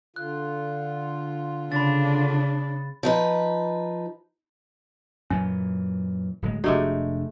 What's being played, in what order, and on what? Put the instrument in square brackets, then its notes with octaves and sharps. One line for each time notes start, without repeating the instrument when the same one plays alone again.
[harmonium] D3 F4 [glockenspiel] F#6
[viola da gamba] C#3 [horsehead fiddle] D4 [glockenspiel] B5 A6
[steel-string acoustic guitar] F3 D#4 B4
[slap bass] F#2 A#2 E3 [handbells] C#4
[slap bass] D1 A2 G#3
[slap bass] F1 D4 [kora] G#3 A3 D#4 [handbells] F#4 G4